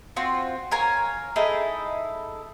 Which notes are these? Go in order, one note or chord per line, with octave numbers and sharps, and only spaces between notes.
C4 F4 F#4
A#4 C#5 F5 G#5
D#4 E4 G#4 A4